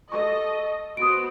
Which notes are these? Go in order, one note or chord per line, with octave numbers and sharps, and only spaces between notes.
A4 D#5 C#6
B3 F#4 C5 D#6 D7